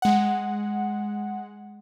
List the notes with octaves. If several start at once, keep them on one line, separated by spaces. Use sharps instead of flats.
G#3 F#5